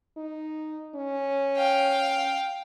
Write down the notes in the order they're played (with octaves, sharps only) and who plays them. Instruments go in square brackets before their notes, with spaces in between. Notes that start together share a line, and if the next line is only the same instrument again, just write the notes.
[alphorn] D#4
C#4
[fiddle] F5 G5